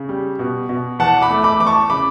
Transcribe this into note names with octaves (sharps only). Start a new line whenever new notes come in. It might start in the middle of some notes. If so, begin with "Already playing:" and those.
Already playing: C#3
G3
B2
B2
E2 F#5 A5
B5 D6
A3
B5 D6
E2 D6
A5 C#6
C#3 B5 D6